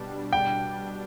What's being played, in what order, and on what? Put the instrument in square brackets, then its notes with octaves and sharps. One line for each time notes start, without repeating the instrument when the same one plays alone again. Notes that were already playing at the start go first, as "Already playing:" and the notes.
Already playing: [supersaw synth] B2 G3 D4
[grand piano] G5